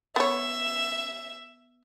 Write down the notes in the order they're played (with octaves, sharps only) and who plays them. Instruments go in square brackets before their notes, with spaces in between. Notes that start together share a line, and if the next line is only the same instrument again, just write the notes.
[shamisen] B3 C#5 [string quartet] E5